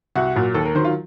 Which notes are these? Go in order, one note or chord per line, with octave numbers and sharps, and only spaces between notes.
C2 F#4
A#2 F#3
D#2 A4
A#4
D#3 F#3 C5
F4